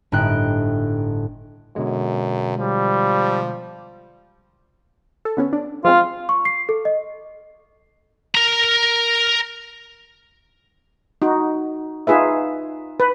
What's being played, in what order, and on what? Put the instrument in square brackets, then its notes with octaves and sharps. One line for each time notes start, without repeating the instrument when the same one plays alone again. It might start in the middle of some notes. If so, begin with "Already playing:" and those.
[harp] G1 A2 D#4 G5 F#6 D7
[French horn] F#2 [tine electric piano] B2 D3 G#3
[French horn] F3 [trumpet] G3
[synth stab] A4
D3 B3 C#4
D4
[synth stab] F3 G#3 C4 [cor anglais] F4
[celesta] C#6
C7
A4
D#5
[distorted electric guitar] A#4 A#5
[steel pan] D#4 F#4
D#4 F4 G#4 B4 E5
B4